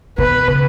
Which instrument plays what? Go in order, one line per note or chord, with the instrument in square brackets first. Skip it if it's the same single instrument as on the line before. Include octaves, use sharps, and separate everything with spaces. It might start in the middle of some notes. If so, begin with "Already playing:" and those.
[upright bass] B2 [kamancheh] B4
[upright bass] C#3